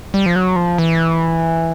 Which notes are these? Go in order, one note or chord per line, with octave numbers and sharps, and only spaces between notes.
G3
F3
F#3
F3
E3